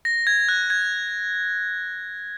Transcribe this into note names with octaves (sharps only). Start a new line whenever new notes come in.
A#6
G#6
F#6
G#6